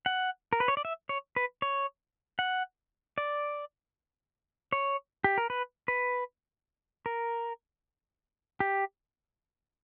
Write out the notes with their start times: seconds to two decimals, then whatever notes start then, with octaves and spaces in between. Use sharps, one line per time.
0.06 F#5
0.53 A#4
0.60 B4
0.68 C#5
0.77 D5
0.85 E5
1.09 C#5
1.36 B4
1.62 C#5
2.39 F#5
3.18 D5
4.72 C#5
5.24 G4
5.38 A#4
5.50 B4
5.88 B4
7.06 A#4
8.60 G4